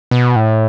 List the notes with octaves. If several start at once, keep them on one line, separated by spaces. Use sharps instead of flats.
B2
A2